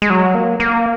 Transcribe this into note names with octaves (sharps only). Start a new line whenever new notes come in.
G#3
F#3
A#3
A#3